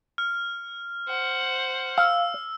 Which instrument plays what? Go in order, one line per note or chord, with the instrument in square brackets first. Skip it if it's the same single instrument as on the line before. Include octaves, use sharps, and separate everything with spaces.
[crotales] F6
[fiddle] C5 F#5
[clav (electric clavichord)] F5 [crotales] E6